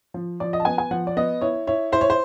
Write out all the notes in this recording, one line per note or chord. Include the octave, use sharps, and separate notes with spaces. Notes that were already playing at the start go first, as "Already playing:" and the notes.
F3
F3 D5
D#5
A5
B3 G#5
G#5
F3 F#5
D5
B3 D#5
E4 C#5
E4 C#5
E4 C5
C#5
C5